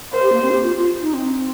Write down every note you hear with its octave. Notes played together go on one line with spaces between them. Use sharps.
A#4 C5
G4
A#3
C4
G4
F4
F4
D#4
C4